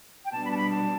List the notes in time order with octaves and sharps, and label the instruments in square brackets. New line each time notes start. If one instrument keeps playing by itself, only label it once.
[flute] G5
[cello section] B2 G3 D4 [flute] A5
[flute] B5
A5
B5
A5